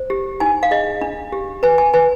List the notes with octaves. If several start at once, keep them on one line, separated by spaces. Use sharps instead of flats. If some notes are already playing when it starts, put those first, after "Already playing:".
Already playing: C5
G4
D#4 G#5
F5
G#4 D#5
D4
G4
B4 G#5
G#5
B4 G#5